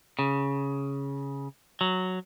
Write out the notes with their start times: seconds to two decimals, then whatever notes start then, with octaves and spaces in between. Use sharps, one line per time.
0.19 C#3
1.81 F#3